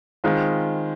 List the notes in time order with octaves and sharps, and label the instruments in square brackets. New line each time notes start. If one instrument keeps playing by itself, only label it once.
[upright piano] D#3 G#3 C4 F4